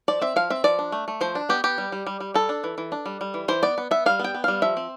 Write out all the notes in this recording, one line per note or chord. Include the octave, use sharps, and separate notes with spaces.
F3 D5
C4 E5
F3 F5
C4 E5
F3 D5
D4
A3
A3
F3 C5
D4
B3 G4
B3 G4
G3
G3
G3
G3
G3 A4
D4
E3
E3
D4
G3
G3
E3
E3 C5
B3 D5
B3
B3 E5
G3 F5
B3
G5
B3
G3 F5
F3 E5
C4